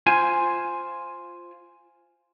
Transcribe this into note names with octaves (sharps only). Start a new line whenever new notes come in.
F4 C5 G#5